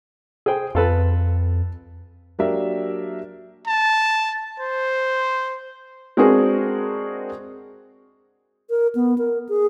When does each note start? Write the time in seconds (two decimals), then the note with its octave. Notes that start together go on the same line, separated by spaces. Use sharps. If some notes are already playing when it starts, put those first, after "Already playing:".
0.46 G#4 C5 G5
0.75 F2 F4 A4 B4
2.39 F#3 A#3 D4 G4 A#4 E5
3.67 A5
4.60 C5
6.17 G#3 C4 D4 F#4 G#4 A#4
8.70 A#4
8.95 B3
9.18 A#4
9.49 G#4